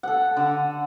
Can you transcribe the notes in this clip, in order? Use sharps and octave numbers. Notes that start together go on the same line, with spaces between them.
A4 F#5
D3